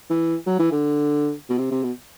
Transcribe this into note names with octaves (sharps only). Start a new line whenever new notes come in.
E3
F#3
E3
D3
B2
C3
C3
B2